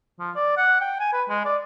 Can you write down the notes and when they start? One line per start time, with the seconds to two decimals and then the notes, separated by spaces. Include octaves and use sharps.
0.20 F3
0.36 D5
0.58 F#5
0.81 G5
1.00 G#5
1.13 B4
1.29 G#3
1.45 D5